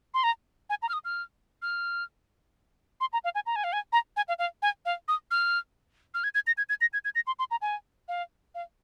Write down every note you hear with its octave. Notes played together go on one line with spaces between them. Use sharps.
C6
A#5
G#5
A#5
F6
D#6
F6
F6
C6
A#5
F5
G#5
A#5
G#5
F5
G#5
A#5
G#5
F5
F5
G#5
F5
D#6
F6
F6
G#6
G#6
A#6
G#6
G#6
A#6
G#6
G#6
A#6
C6
C6
A#5
G#5
F5
F5